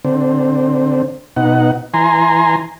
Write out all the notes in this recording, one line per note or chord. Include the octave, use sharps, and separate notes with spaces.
D3 C4
B2 D#4 F#5
E3 G#5 A#5 C6